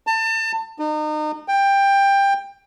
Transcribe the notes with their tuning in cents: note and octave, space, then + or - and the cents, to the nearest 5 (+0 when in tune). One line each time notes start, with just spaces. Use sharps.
A5 +30
D#4 -35
G5 +15